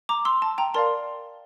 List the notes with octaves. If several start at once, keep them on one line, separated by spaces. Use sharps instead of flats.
A#5 D6
C6 E6
A5
G5 A#5
A#4 D5 F5 A5 C6